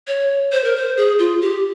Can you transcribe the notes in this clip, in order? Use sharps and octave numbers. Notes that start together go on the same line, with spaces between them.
C#5
C5
A#4
C5
G#4
F4
G4